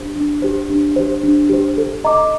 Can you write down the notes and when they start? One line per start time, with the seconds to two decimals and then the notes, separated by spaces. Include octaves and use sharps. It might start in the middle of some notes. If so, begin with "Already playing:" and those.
Already playing: D4 G4 C5
0.15 D4
0.42 G4 C5
0.70 D4
0.96 G4 C5
1.23 D4
1.50 G4 C5
1.77 A4
2.04 D#5 A#5 D6